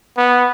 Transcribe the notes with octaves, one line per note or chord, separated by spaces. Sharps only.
B3